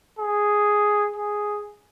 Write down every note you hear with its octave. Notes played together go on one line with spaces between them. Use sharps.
G#4
G#4